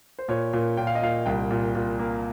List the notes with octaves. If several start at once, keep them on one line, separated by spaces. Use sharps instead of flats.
C5
A#2 C#5
A#2
A#2 G5
F5
D#5
A#2 F5
C2 G5
A#2
A#2
A#3